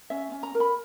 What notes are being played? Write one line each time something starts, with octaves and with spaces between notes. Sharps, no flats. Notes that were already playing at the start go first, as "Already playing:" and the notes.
C#4 E5
C#4
A#5
A#4
B5